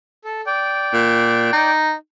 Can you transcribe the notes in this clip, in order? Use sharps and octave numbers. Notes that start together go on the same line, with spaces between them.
A4
D5 G5
A#2
D#4